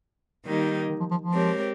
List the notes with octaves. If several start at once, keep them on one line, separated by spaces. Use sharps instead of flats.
D#3 G3 A#3 D#4
D#3
F3
F3
F3
G#3 C4 G4 A#4 C#5